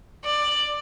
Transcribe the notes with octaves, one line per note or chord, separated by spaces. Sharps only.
D5